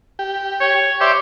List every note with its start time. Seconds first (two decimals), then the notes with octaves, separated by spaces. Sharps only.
0.19 G4
0.61 C#5
1.01 G4 C5 D5 E5